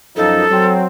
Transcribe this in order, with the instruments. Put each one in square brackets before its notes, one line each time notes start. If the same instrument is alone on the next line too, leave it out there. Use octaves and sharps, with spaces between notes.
[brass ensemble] F#2 F3 D#4 [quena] A4
[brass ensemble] F#3 C4